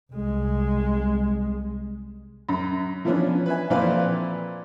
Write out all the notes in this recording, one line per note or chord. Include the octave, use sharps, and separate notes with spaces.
C2 G#3
F#2
E3 F3 B3 C#4 D4
B4 E5 G#5
F2 A#2 E3 C4 B4 F5